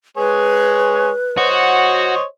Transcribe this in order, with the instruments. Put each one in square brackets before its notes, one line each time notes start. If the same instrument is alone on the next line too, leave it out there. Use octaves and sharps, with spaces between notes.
[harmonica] G#3 G#4 C#5 [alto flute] B4
[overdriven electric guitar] F#4 [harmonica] C5 C#5 D#5